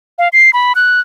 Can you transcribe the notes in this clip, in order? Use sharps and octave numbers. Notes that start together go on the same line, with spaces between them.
F5
C7
B5
F#6